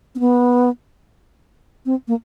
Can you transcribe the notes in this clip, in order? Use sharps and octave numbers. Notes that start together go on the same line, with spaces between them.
C4
B3
C4
A#3